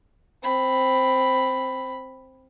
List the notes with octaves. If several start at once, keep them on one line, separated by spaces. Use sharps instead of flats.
C4 B5